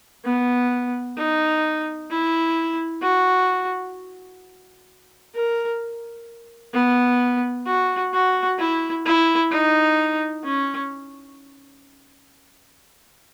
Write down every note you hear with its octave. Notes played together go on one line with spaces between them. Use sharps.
B3
D#4
E4
F#4
A#4
B3
F#4
F#4
E4
E4
D#4
C#4